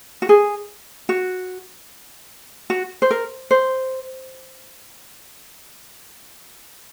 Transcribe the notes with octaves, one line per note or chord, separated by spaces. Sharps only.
F#4
G#4
F#4
F#4
C5
A#4
C5